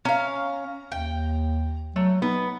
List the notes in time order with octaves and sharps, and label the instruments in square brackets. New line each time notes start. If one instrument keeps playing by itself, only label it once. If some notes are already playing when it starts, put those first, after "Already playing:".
[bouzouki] C#4 F5 [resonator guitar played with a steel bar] A#5
[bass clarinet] D#2 [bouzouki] G5
[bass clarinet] F#3 [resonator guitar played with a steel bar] A3
[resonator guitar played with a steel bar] B3 [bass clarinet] D#4